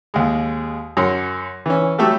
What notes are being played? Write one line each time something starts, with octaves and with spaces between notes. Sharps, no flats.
D#2 G#3
F#2 A#4 C#5 C6
E3 C#4
F#3 G3 A3 G4 A4